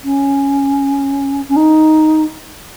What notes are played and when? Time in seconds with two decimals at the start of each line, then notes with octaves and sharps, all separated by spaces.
0.04 C#4
1.49 C#4
1.56 D#4